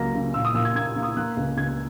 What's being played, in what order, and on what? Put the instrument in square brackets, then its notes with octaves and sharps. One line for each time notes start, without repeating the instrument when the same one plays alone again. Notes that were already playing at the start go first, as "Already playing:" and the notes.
Already playing: [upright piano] C#2 F#3 A#3 A#6
C#3
A#2 E6
D#6
A#2 E6
G#6
A#3 G#6
A#3
D#6
A#3 F#6
C#2
C#2 G#6